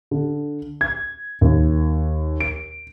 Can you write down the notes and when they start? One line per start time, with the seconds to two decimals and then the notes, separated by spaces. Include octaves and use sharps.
0.11 D3
0.81 G#6
1.41 D#2
2.40 D7